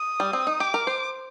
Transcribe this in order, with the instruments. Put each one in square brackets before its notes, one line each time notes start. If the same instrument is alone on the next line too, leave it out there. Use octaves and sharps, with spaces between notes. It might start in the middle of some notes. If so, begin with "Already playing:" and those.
Already playing: [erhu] D#6
[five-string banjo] G3
C4
D#4
[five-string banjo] G4 [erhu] D6
[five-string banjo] A#4
C5